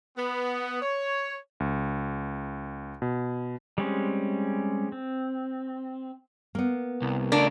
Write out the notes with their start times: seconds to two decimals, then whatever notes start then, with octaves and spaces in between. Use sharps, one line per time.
0.17 B3
0.82 C#5
1.60 C#2
3.02 B2
3.78 G3 G#3 C4 C#4
4.92 C4
6.55 A#3 B3
7.02 C2
7.32 C#3 A3 D4 A#4